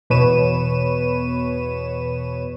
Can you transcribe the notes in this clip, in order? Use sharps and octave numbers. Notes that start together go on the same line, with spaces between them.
E2 B2 B4 C#5 D#7 E7